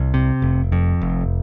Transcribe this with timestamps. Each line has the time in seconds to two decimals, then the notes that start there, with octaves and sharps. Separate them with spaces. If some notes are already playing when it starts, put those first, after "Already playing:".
Already playing: C2
0.14 C3
0.42 F1
0.72 F2
1.01 F1